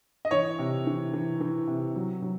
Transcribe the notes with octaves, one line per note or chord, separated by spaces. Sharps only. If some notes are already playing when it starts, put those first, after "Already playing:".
D#5
E3 C#5
C3
E3
E3
E3
C3
F#3
F#3